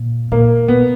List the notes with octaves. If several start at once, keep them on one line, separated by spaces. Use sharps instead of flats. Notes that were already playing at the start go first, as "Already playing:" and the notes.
Already playing: A#2
A#2 A#3
B2 B3